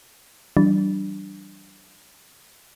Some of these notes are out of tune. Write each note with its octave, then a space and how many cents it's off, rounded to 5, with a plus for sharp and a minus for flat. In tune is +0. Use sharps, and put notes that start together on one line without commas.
E3 +0 G3 -40 D4 +0